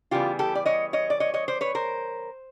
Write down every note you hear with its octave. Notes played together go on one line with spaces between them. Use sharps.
C#3 E3 G3 B3 F4 G4
G4 A4
D5
C#5 D#5
C#5 D#5
D5
C#5 D#5
C#5 D#5
C5 D5
B4 C#5
A#4 C5